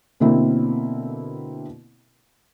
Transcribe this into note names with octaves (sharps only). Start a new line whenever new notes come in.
B2 D3 A#3 C4 E4